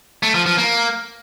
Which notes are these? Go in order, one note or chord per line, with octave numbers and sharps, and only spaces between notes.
A3
F3
F3
A#3